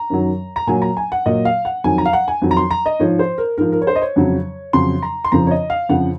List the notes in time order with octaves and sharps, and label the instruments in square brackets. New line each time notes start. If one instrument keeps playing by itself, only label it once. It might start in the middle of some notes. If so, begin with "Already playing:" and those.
Already playing: [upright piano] A#5
F#2 D#3 F#3
A#5
A#2 F#3 G#5
A#5
G#5
F#5
A#2 F#3 D#5
F5
F#5
F2 D#3 F#3 G#5
A#5
F5
F#5
G#5
F2 D#3 F#3
A#5
C6
A#5
D#5
G#2 F3 C#5
C5
A#4
G#2 F3 A#4
A#4
C#5
C5
D#5
C#5
F2 C#3 F#3
F2 C#3 F#3 C6
A#5
C6
F2 C#3 F3 A#5
C#5
D#5
F5
F2 C#3 F3 F#5